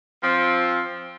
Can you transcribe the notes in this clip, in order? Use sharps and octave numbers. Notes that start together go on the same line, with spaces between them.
F3 C4